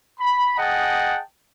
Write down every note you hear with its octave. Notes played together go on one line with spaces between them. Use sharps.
B5
G#4 D#5 F#5 G5 A5